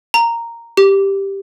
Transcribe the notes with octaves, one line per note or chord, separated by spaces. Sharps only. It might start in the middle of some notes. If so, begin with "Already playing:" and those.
A#5
G4